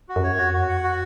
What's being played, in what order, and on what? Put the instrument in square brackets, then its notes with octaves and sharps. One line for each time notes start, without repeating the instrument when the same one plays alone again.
[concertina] F#4
[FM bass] F#2
[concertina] C#5
[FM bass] F2 [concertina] F#4
[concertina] F#4
F#5
F#4